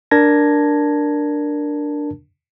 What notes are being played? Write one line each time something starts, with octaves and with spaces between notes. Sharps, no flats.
D4 A#4 A5 G#6 A#6